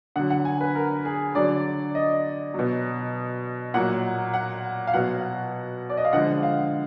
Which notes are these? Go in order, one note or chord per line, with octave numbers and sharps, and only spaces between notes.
D3 F#3 F#5
F#5
G#5
B4
A#4
G#4
D3 F#3 D5
D#5
B2 F#3
A#2 F#3 F#5
F#5
F5
B2 F#3 F#5
D5
D#5
F5
D3 F3 G#3 F#5
F5